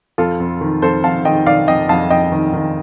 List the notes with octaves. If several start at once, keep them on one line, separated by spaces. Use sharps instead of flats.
F2 F4 A4
F2
D#3
F2 A4 C5
F2 F5 A5
D#3 D#5 G5
D#3 D5 F5
F2 D#5 G5
F2 F5 A5
F2 D#5 G5
D#3
D#3